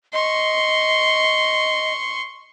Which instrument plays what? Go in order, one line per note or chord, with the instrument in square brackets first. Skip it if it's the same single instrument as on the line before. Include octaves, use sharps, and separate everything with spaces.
[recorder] D#5 [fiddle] C6 C#6